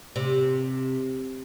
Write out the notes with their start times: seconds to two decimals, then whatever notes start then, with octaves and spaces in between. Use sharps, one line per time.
0.16 C3